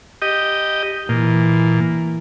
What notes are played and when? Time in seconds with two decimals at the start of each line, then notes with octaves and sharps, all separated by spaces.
0.22 G4 D#5
1.09 A#2 E3